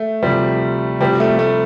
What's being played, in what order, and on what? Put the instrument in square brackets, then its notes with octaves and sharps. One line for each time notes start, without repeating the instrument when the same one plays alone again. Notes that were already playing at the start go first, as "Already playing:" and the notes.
Already playing: [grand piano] A3
[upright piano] D2 C3 F3 C4 G4 [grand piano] G3
[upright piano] D2 C3 F3 C4 G4 [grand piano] G3
[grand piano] A3
A3